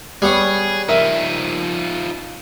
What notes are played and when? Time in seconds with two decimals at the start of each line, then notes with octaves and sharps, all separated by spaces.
0.22 G3 B3 G#4 C#5
0.88 F3 D#4 A#4 E5